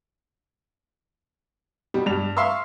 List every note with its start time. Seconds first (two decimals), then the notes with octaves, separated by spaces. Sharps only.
1.94 B2 G3
2.06 G2 F7
2.37 E5 F5 C6 C#6 E6